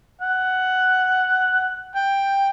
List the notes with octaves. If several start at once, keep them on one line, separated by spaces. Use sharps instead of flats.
F#5
G5